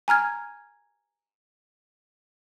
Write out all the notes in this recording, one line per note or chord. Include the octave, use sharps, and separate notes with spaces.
G#5 A#5 F6 G#6